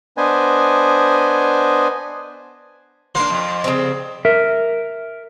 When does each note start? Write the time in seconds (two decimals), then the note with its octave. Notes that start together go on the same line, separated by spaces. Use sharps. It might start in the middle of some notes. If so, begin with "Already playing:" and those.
0.17 B3 D4 B4 C5 D#5 G#5
3.15 A#3 D4 C5
3.30 F2
3.64 C#3 G3 C4
4.25 A#4 E5